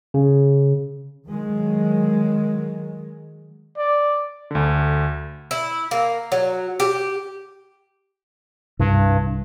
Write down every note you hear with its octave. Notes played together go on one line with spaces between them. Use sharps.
C#3
D#3 F#3 G#3
D5
D2 D3
E4
A#3
F#3
G4
C2 G2